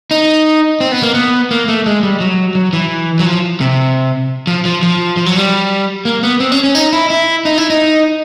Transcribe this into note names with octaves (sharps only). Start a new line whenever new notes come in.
D#4
C4
B3
A#3
B3
A#3
A3
G#3
G3
F#3
F#3
E3
F#3
F3
C3
F3
F3
F3
F3
F#3
G3
A#3
B3
C4
C#4
C#4
D#4
E4
E4
D#4
E4
D#4